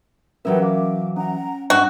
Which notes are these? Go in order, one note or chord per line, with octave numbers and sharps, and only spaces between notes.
E3 F#3 C#4 G4 A#4 B4 E5 F#5
F5 D6
C#4 F#5 A#5
G2 D#4 F#4